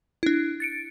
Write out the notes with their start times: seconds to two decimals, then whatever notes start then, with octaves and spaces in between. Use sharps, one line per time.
0.23 D4 E4
0.60 A6 C#7 D7